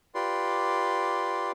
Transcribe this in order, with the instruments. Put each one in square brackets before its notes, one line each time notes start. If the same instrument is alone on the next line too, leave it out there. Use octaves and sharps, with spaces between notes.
[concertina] F4 G4 B4 D5 C6